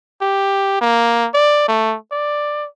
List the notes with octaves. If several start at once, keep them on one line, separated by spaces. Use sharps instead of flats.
G4
A#3
D5
A3
D5